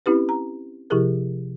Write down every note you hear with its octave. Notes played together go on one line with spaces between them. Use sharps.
C4 C#4 E4 G4 B4
A#5
C3 F3 E4 G4 G#4 A#4